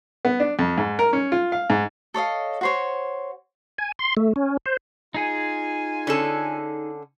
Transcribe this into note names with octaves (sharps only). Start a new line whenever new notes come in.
B3
D4
F2
G#2
A#4
C#4
F4
F5
G#2
A4 C#5 D#5 F5
F#4 C5 C#5
G#5
C6
A3
C#4
C5
D#4 F4 G#4 G#5
D3 C#4 A4